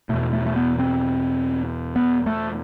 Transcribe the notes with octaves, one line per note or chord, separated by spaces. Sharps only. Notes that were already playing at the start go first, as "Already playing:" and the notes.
E2 B2 A3
A3
A3
B3
C4
B3
A3